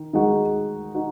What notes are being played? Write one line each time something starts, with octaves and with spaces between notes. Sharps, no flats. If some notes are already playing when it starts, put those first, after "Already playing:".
Already playing: D#3
D#3 G#3 D#4 F#4
D#4 F#4